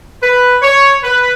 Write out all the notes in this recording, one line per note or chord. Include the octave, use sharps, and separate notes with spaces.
B4
C#5
B4